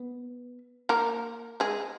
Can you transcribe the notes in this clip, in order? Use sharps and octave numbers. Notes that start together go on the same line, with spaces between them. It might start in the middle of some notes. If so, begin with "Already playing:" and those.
Already playing: B3
A#3 A#4
G#3 G#4